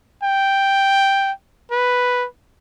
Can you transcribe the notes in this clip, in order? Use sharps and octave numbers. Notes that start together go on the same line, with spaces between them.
G5
B4